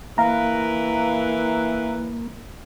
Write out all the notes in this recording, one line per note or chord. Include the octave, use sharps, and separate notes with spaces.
E3 A#3 A#4 B4 F5 A#5